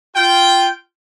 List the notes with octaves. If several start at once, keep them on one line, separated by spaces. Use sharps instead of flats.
F4 G5